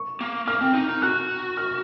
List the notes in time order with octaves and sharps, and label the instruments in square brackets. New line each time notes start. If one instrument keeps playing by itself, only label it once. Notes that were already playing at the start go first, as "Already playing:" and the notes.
Already playing: [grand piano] C#6
[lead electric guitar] A#3
[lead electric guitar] A#3 [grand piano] F6
[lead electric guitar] C4
D#4
D#4
[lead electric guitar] F#4 [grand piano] F#6
[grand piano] F6